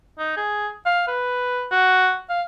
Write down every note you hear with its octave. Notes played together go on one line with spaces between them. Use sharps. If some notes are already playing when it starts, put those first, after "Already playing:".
D#4
G#4
F5
B4
F#4
F5